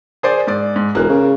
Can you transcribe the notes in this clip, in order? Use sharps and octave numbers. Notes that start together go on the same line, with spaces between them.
G#4 C5 D5
G#2 D5
G#2
E1 A#3 F#6
C#3